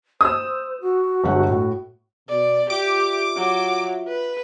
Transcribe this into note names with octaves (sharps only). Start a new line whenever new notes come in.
C5 D#6 E6
F#4
G1 G#3 F#5
A2 F#4
B2 D5
F4 G4 E5 D6
F#3
B4